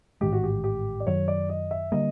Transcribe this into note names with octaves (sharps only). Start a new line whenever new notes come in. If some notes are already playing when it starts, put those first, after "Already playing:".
A1 G#2 D#3 G#3 G4
F#4
G4
G4
D5
F#2 D#3 F#3 C#5
D5
D#5
E5
D3 G3 A#3 D#5